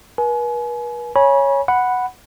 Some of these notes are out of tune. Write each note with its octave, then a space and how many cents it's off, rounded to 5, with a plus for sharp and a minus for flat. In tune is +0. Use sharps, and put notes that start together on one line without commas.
B4 -45 G#5 +35
C#5 +0 G#5 +0 B5 -35
F#5 +0 B5 +0